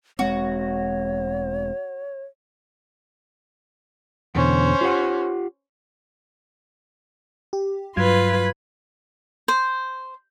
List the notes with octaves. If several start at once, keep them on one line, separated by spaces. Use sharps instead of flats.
E1 G#3 C4 F#4 C#5
E2 B2 D3 C#4 C5
F4 G4 F#5
G4
G2 F#3 F4 B4 G#6
C5